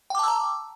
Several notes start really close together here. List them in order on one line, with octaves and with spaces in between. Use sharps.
G5 D6 A5 E6 A#5